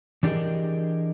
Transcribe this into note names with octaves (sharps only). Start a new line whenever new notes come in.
E3 D4 G4 G#4 A#4 D#5